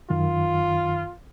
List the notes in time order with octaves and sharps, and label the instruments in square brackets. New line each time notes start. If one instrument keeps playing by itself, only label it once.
[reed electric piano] F#2 D#3 [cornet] F4